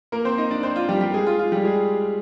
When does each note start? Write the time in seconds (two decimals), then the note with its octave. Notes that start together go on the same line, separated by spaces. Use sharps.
0.12 A#3 A#4
0.25 C4 C5
0.38 D#4 D#5
0.51 D4 D5
0.63 C4 C5
0.76 F4
0.89 G3 G4
1.01 G3 G4
1.14 G#3 G#4
1.27 F4
1.39 F4
1.52 G3 G4
1.65 G#3 G#4